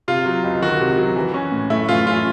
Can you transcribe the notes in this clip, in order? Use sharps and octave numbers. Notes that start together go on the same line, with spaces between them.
C3 F4
F#3
C#2
D#3 F#4
C3
F#3
E3
C#4
A2
A3 E4
E3 F4
C#4 F4